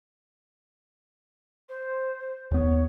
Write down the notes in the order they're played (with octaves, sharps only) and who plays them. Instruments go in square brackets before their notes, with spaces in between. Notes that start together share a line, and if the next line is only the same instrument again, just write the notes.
[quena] C5
[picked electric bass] D#2 B3 [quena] C#5